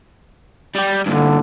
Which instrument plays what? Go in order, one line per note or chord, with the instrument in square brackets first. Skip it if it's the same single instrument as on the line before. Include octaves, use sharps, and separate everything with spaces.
[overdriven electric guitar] G3 G4
[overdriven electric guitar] G2 A#2 [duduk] D3